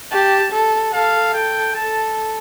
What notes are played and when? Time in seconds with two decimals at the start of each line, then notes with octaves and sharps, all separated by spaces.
0.12 G4 A5
0.52 A4
0.93 A4 F5
1.33 A4 G5
1.74 A4 A5